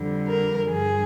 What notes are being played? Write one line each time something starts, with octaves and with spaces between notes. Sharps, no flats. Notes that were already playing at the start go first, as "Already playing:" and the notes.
Already playing: F2 D3 G3
A#4
G2 F3 G#4